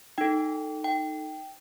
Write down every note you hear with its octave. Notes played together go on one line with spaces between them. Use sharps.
D#4 A4 G5
G5